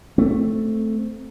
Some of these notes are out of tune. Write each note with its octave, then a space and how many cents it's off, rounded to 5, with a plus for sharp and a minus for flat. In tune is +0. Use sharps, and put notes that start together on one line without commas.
A3 +0 C4 +0